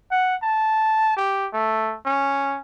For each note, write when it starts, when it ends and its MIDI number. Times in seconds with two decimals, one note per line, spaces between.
0.11 0.35 78
0.42 1.17 81
1.17 1.48 67
1.53 1.96 57
2.05 2.59 61